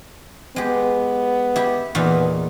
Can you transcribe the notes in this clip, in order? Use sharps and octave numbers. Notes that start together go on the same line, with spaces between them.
G#3 B3 G4
E4 G4
E2 A#2 B3 D#4